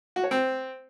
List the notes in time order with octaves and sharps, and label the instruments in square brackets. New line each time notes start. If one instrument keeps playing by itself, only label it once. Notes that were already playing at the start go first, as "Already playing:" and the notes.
[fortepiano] F#4
C#5
C4